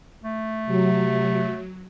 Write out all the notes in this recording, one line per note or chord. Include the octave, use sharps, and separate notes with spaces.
A3
C3 F#3